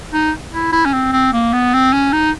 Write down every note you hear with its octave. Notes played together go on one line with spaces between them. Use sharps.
D#4
E4
E4
C#4
C4
C4
A#3
B3
C4
C#4
D#4